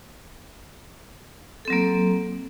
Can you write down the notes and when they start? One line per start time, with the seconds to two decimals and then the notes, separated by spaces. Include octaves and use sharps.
1.65 A4
1.68 C4
1.70 F#3
1.73 A#3